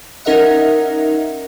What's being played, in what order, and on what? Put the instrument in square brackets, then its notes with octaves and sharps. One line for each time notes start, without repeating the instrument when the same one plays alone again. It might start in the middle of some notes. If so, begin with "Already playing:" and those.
[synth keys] C#4 D#4 A#4 D#5 E5 F#5